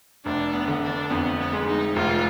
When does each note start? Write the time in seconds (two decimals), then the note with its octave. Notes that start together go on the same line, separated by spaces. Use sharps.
0.25 F1 D4
0.53 B3
0.68 D3
0.83 D4
1.10 F2 B3
1.39 B3
1.53 G#3
1.67 D#4
1.96 F1 F4